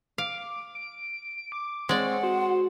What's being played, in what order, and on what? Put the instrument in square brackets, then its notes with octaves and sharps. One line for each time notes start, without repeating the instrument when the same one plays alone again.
[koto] F5 [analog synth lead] D6
[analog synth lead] D7
D6
[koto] G#3 D5 [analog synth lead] C4 [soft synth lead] C#5 [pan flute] F#5
[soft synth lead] F#4 [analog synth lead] C5